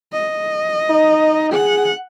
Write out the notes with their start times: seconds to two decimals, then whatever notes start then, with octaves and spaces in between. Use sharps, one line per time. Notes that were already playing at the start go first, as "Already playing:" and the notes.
0.13 D#5
0.90 D#4
1.53 G#4 F#5